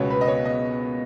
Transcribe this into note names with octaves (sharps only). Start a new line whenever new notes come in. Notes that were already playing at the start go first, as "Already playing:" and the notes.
Already playing: C#2 B2 B3 C#5
B4
D#5
C#5
D#5